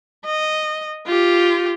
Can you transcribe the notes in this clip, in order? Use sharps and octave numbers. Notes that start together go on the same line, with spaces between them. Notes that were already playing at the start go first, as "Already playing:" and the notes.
D#5
F4 G4